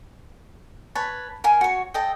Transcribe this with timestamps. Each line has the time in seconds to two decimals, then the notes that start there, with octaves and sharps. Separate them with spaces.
0.95 B4 C#5 A5
1.44 A#4 F5 G#5
1.61 F#4 C#5
1.94 A4 D#5 G5